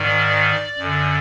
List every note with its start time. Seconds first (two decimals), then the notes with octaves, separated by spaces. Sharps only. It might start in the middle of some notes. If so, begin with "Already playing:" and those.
Already playing: G#2 D#3 D5
0.78 F#2 D3